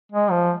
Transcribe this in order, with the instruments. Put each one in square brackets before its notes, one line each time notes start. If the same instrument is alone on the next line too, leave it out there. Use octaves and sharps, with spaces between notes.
[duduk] G#3
F3